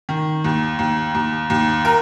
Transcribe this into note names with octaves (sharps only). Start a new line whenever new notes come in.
D#3
D#2
D#2
D#2
D#2
A#4